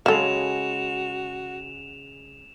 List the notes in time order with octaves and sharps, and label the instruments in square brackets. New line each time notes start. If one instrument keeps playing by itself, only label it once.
[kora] C#3 G#3 [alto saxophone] F#4 [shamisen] A4 F5 [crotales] E7 F7